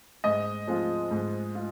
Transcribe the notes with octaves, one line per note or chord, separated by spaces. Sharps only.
G#2 D#5
F3 G#3 C4 F4
G#2
F4